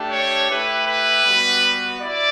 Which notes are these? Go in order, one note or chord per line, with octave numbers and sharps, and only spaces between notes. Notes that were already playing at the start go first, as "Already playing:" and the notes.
Already playing: A3 D4 G4
C#5
A3 E4 G4 B4
B4
G3 B3 F#4
E4 D5